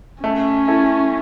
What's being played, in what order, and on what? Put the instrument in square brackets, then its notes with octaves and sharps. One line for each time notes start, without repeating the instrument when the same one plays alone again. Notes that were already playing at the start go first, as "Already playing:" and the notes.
[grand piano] A3 [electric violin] C#4
[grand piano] E4 A4